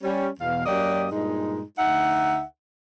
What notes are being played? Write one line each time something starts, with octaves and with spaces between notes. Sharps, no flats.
G3 C#4
E2 B2 F5
F#2 F#3 A#3 G4 D5 D#5
G2 A#2 G#3 D#4
D2 D#4 E5 F#5